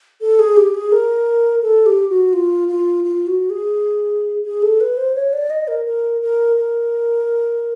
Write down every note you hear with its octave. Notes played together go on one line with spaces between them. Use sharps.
A4
G#4
G4
G#4
A#4
A4
G4
F#4
F4
F4
F4
F#4
G#4
G#4
A4
B4
C5
C#5
D5
D#5
A#4
A#4
A#4
A#4